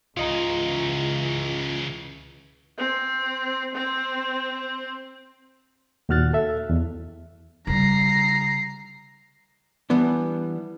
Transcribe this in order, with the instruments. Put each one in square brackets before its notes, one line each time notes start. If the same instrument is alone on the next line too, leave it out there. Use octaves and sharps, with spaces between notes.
[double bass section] C#2 E3 [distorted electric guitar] C#3 D#4 [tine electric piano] F4 D#5 A#5
[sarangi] C4
C4
[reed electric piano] D#2 A#2 F#4 F6 F#6 A6
A4 E5
E2
[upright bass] C#3 G3 [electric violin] A#5 C7
[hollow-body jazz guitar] E3 G3 B3 D4